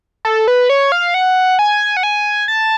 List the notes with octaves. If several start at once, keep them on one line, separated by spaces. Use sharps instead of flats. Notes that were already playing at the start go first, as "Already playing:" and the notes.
A4
B4
C#5
F5
F#5
G#5
F#5
G#5
A5